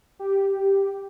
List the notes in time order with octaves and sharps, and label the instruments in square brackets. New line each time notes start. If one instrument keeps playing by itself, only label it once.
[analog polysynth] G4